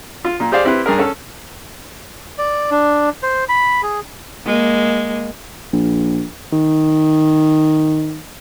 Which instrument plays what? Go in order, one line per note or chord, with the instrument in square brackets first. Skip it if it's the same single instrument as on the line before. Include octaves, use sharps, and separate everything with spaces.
[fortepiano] F4
A#2
G4 G#4 C5 D5 F5
C4 E4 G4 B4
G2 G#4 A#4
C#4 A4
[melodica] D5
D4
C5
B5
G#4
[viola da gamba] G#3 A#3
[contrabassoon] A#1
D#3